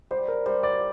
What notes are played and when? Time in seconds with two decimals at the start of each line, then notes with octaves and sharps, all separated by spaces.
0.11 G3 C5
0.28 A#4
0.46 G3 C5
0.63 D5